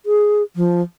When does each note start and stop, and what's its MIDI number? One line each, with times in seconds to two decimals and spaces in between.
0.06 0.43 68
0.56 0.81 53